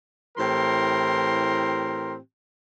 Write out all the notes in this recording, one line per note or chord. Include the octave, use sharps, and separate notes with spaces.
A2 E3 C4 G4 A#4 C6